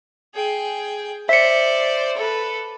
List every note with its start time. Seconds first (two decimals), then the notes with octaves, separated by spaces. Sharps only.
0.35 G#4 G5
1.29 C5 D5 E5 C#7
2.17 A4 B4